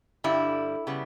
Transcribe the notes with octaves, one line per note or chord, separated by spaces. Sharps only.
G2 D3 G3 E4
C#3 G3 B3